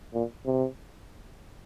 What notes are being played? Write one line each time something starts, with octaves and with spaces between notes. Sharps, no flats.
A#2
C3